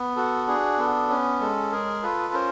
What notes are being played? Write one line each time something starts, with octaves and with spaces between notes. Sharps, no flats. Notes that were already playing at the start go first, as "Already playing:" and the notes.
Already playing: B3
F#4 A4
D4 G#4
B3 A4
C#4
G#3 A4
G#4 A#4
F4 A4 B4
C#4 A#4 C5